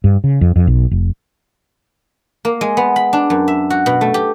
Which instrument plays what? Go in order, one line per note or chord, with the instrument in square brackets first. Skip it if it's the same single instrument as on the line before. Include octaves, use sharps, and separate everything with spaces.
[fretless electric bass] G2
C#3
F2
F2
B1
F1
[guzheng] A#3
G#3
B3
B5
D4
F#2
E5
F#4
B2
A3
G4